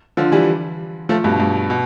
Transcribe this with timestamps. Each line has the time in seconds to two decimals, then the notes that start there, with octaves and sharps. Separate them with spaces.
0.17 D3 F3
0.32 E3 G3
1.09 F3 A3
1.24 G2 B2
1.40 G2
1.70 B2